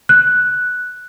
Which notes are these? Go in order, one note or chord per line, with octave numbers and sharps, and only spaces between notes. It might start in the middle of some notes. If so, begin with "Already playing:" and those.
F#6